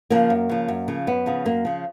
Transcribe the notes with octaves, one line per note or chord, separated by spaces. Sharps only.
C#3 F3 A#3
F#2
C#3 F3
F#2
C#3 F3
F#2 B3
C#3 F3
F#2 A#3
C#3 F3